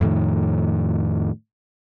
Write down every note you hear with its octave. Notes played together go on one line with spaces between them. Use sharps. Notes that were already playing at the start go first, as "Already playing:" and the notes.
F2 A2 D#3